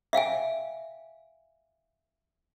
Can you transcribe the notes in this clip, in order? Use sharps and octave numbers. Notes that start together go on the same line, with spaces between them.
E5 F5 G5 G#5